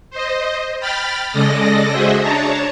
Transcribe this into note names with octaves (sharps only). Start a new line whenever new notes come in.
C5 D#5
G5 B5 F6 A6
C#3 G#3 A4 D5 D#5 A#6
F#4 G#4 C5 D#5 E5
D4 C#5 A5 A#5